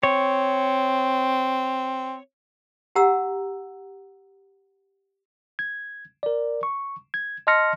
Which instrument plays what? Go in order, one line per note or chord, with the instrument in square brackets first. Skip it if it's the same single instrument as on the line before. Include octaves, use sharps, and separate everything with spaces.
[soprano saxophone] C4 [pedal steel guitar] C#5
[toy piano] G4 F#5 A#5 E6
[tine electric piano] G#6
A#4 D5
C#6
G#6
D#5 A5 C6 F6 A#6 C#7